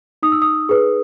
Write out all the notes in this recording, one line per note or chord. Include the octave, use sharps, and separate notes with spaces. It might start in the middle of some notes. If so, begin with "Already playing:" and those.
D#4 D#6
E6
D#6
G#4 B4